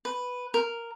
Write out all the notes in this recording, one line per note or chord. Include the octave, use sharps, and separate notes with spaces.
B4
A#4